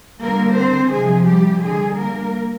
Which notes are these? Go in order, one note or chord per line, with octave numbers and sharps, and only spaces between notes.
D3 G3 A#3 A#4
C4 C5
C3 F3 G#3 G#4
G3 G4
D3 G3 G#3 G#4
A#3 A#4